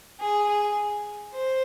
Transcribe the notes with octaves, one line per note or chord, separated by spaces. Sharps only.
G#4
G#4
C5